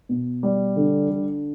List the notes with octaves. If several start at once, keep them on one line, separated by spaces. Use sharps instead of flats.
B2
G3
D3
D3